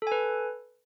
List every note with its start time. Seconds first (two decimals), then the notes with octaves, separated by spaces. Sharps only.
0.02 A4
0.07 G#5
0.12 B4